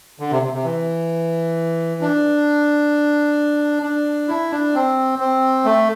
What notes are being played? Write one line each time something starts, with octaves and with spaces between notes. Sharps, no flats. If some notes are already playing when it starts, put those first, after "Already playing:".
D3
C3
C3
C3
E3
D4
D4
E4
D4
C4
C4
A3